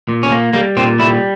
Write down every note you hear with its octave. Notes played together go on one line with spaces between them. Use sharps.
A#2
C#4
A#3
G3 A#3
A#2 C4
G3 E4